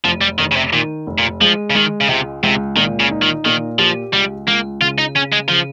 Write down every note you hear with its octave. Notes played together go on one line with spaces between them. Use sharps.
F1 F3
G3
F1 D#3
C#3
C3
A#2 D#3
F1
A#2
F3 G#3
C#3
D#3 G#3
C#3
C#2 C3
C#2 C3
A#2 D#3
C#3
D#4
D#3
A#2 D#3
F3 G4
C#2 G3
C#2 A#3
C#3 F4
D#4
C#3 C#4
G#3
C#3 F3